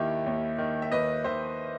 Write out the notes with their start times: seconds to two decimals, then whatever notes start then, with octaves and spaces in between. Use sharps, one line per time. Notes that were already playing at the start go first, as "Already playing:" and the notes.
Already playing: D#2 D#3 E4 G4
0.26 D#2
0.58 D#3
0.82 E5
0.92 D#2 B4 D#5
1.24 D#3 C5 E5